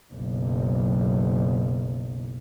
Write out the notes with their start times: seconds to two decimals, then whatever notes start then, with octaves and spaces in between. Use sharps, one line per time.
0.13 F#1 B1